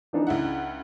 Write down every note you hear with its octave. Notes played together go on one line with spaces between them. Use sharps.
E3 D4 D#4
C#2 E4 F#5